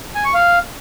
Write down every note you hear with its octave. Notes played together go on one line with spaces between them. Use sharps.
G#5
C#6
F5